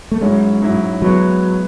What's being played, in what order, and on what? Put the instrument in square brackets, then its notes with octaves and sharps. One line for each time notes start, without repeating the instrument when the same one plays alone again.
[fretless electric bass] A3
[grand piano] G#2 F#3 C#4 E4 [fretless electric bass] G#3
[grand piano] G#2 F#3 C#4 E4
[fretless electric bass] F#3 [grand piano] G#3 B3 E4